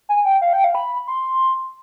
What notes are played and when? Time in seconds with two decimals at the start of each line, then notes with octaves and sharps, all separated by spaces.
0.09 G#5
0.25 G5
0.41 F5
0.53 G5
0.64 F5
0.75 B5
1.07 C6